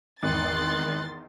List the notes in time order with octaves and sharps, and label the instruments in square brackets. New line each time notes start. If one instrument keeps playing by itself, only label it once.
[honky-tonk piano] G#1 [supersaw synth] E2 D#3 [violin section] C6 A6 [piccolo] F#6